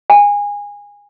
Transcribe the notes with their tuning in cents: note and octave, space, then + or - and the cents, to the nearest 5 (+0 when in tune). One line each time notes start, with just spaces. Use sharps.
G#5 -20